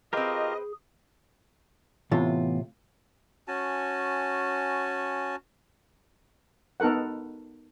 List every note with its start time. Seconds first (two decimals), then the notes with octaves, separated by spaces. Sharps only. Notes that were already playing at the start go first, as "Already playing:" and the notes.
0.13 C4 F4 G4 G#4 A#4 B4 D#5
2.11 A2 C3 E3 B3 F4
3.48 C#4 F#4 G#5 A5
6.80 B3 D#4 A4 A#4 F#5